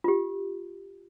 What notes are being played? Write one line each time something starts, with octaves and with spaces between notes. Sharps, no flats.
F4 G4